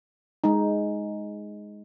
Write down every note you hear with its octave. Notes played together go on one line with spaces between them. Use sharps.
G#3 D#4